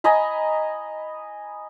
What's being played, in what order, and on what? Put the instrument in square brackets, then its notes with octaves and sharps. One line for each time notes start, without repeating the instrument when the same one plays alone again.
[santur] D#5 G#5 A#5 B5